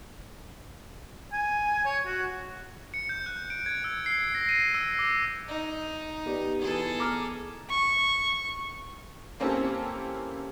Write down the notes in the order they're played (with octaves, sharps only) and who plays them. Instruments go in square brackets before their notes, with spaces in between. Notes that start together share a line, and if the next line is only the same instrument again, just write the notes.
[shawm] G#5
C#5
F#4
[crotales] C#7
G6
F#6
D7
G#6
E6
C7
A#6
D#7
E6
D6
[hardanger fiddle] D#4
[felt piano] B3 G4 D5
[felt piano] E3 B3 E4 [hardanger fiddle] G#4 A4
[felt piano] A#5 D6 F6
[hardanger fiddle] C#6
[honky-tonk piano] A#3 C4 C#4 E4 G4 A4